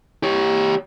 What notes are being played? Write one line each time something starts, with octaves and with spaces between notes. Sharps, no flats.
G4 C#5